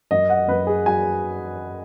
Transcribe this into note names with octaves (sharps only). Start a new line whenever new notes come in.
F#2 D#5
F#5
F#2 B4
G#4
F#3 G#5